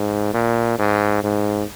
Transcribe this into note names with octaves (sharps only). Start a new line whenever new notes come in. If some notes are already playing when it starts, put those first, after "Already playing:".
Already playing: G#2
A#2
G#2
G#2